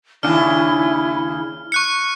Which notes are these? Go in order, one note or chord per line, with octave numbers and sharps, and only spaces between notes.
D#2 C#3 D4 E4 F6
C#6 F#6 C#7